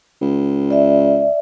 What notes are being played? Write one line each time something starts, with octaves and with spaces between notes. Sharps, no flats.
C#2
D5 E5